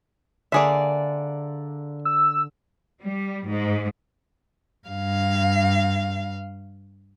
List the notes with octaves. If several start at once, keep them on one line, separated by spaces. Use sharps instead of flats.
D3 A#3 G#4 D5 E5
E6
G3
G#2
G2 F5